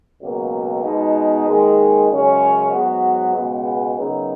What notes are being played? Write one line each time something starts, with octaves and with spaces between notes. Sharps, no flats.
C#2 B2 F#3 A#3
B2 G#3 B3 D#4
D#2 D#3 G#3
F#2 C#3 G#3 C#4
G#2 F#3 B3 F#4
C#2 B2 G#3 B3
F#2 C#3 F#3 B3 D#4